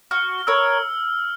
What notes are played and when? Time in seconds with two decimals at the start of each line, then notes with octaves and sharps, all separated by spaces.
0.11 F#4 F6
0.47 A#4 C#5 E6